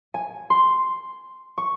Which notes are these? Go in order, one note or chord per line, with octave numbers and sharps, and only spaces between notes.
G#5
C6
C#6